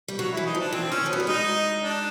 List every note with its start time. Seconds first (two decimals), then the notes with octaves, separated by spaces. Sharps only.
0.08 G3
0.18 F#3 F#4
0.32 E4
0.37 E3
0.45 D#4
0.55 F3
0.60 D4
0.72 E3 C4
0.91 D#3 C#4
1.06 F3
1.09 F#3 B3
1.20 G3
1.27 G#3 D#4
1.81 D4